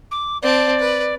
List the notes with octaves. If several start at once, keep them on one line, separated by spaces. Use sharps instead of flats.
D6
C4 D5 A5
B4